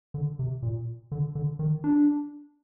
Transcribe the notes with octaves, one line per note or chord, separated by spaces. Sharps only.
D3
C3
A#2
D3
D3
D#3
D4